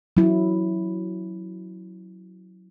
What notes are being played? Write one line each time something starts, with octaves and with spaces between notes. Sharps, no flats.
F#3 E4